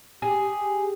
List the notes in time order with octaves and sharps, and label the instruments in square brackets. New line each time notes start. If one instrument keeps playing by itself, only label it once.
[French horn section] G4 [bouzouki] G#4